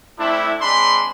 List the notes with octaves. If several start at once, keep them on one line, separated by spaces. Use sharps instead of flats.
A3 C4 D4 E4
G#3 C4 D4 B5 C6